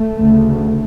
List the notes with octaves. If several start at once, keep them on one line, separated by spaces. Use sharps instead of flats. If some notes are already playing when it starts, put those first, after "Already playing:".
Already playing: A3
D2 C#3